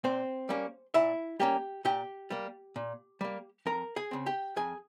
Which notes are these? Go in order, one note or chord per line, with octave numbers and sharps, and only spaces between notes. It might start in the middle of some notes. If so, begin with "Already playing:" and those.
A#2 C4 C5
G3 A#3 C#4
A#2 E4 E5
G3 A#3 C#4 G4 G5
A#2 G4 G5
G3 A#3
A#2
G3 A#3
F2 A#4 A#5
G#4 G#5
C#3 F3 C4
G4 G5
F2 G#4 G#5